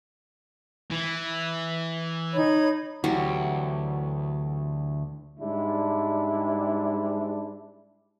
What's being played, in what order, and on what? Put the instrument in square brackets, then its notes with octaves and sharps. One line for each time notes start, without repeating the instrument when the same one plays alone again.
[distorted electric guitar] E3
[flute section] D#4 C#5 B5
[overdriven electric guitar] D2 [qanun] E3 F#3 G3
[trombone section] G#2 G3 G#3 D4 E4